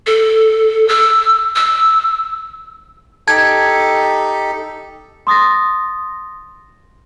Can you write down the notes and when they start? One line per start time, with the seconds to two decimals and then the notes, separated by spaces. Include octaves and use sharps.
0.06 A4
0.88 E6
1.56 E6
3.27 D#4 G4 A4 A5 G#6
5.27 C6 D#6 A6 A#6